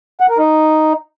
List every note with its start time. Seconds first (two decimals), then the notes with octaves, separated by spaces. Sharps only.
0.20 F#5
0.29 A#4
0.38 D#4